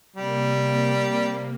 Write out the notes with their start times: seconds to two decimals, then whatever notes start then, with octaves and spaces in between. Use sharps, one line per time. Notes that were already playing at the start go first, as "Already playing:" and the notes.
0.16 C3 G3 A#3